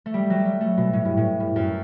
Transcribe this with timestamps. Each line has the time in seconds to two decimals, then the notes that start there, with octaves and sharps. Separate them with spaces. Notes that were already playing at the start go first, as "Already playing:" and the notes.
0.06 A3
0.14 G3
0.30 F#3
0.45 G3
0.61 A3
0.78 B2
0.93 A2
1.05 G2
1.17 A2
1.40 G2
1.56 F#2